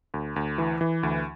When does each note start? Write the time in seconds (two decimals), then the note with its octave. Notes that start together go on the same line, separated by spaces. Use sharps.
0.14 D2
0.36 D2
0.58 E3
0.81 E3
1.03 D2